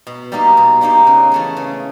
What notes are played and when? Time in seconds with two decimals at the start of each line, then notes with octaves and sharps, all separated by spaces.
0.07 B2
0.32 G3 A#3 D#4 G4
0.57 B2
0.81 G3 A#3 D#4 G4
1.07 C#3
1.32 E3 A3 C#4
1.57 C#3